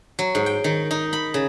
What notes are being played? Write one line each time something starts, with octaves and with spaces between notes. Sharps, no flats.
F#3
G#2
G5
D#3
D#4
B5
C#3